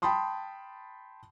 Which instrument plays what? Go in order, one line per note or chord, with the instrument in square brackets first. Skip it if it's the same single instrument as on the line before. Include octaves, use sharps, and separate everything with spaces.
[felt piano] G5 A5 B5 C6 D#6